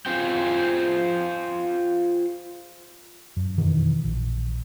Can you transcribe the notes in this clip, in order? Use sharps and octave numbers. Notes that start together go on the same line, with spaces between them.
F4 G#4 C5 G5
F#2
F2 B2 D#3 E3
A#1